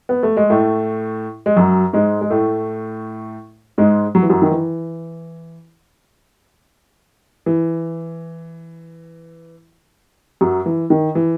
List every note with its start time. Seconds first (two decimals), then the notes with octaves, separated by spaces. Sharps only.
0.09 B3
0.23 A3
0.37 G#3
0.50 A2 A3
1.46 G#3
1.56 F#2 F#3
1.93 G#2 G#3
2.21 G#3
2.30 A2 A3
3.78 G#2 G#3
4.15 F#3
4.23 E3
4.30 F#2 F#3
4.42 D#3
4.51 E3
7.46 E3
10.41 F#2 F#3
10.66 E3
10.90 D#3
11.15 E3